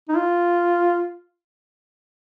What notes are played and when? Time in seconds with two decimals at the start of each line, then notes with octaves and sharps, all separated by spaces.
0.09 D#4
0.17 F4